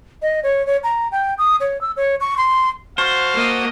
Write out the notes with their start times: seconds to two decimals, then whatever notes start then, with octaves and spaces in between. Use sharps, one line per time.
0.22 D#5
0.43 C#5
0.67 C#5
0.84 A#5
1.12 G5
1.38 D#6
1.60 C#5
1.81 E6
1.97 C#5
2.20 C#6
2.37 C6
2.98 F#4 C5 F5 F#5 A5
3.34 A#3 D#5